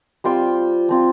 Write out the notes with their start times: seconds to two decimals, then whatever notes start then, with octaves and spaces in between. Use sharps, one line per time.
0.24 G3 C4 F4 G5
0.89 F3 C4 F4